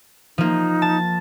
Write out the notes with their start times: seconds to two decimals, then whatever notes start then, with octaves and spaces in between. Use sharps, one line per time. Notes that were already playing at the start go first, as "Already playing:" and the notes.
0.38 F3 A#3 D#4
0.82 A5